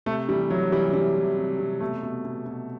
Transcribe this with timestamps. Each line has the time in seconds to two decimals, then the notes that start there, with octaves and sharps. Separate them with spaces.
0.06 C3 A3
0.28 E3 G3
0.50 E3 F#3
0.72 E3 G3
0.93 C3 G3
1.16 E3
1.38 C3
1.59 C3
1.81 B2 A3
2.03 B2
2.25 B2
2.46 B2